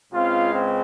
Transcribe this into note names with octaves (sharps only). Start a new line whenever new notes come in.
C#2 C#3 G#3 C4 F4 F5
C4